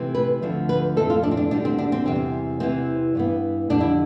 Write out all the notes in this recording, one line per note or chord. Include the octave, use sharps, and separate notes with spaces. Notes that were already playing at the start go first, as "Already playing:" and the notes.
Already playing: C3 E3 A3 C4
B4
D2 D3 F3 C4
B4
F2 E3 A3 C4 A4
F4
D4
C4
D4
D2 D3 G3 D4
C4
D4
C4
E2 C3 G3 C4
E2 C3 E3 C4
G2 E3 B3
F2 D3 G3 D4
E4